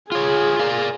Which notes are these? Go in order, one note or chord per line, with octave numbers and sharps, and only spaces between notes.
F4 G#4 C#5
A#4 D5 F5